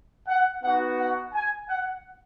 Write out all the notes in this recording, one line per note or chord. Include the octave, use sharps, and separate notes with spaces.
F#5
B3 D#4 F#4 F#5
F#5
G#5
F#5